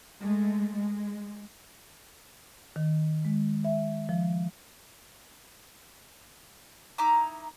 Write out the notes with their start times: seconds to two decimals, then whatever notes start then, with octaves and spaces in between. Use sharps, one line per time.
0.21 G#3 A3
0.74 G#3
2.76 D#3
3.25 G#3
3.64 E5
4.09 F3
6.98 D#4 E4 A#5 D6